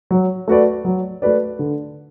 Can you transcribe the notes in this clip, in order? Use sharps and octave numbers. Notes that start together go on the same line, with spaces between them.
F#3
A3 F#4 B4 D5
F#3
A3 F#4 B4 D5
D3